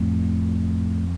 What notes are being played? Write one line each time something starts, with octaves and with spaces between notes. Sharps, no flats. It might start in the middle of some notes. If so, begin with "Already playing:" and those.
Already playing: F2 A2